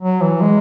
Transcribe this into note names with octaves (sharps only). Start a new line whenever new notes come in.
F#3
E3
G#3